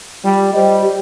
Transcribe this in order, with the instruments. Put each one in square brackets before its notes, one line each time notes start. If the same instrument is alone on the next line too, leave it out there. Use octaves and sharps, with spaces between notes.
[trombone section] G3 [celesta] F4
[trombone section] G3 [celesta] C5 D#5
[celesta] G4